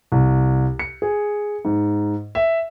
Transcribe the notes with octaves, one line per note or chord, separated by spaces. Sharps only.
C2
C#7
G#4
G#2
E5